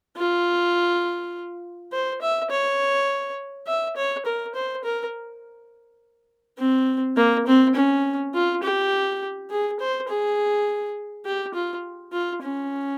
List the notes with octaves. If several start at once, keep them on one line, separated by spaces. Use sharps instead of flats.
F4
C5
E5
C#5
E5
C#5
A#4
C5
A#4
C4
A#3
C4
C#4
F4
G4
G#4
C5
G#4
G4
F4
F4
C#4